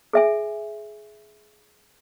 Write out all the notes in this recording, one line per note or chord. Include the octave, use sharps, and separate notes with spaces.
G#4 E5 G#5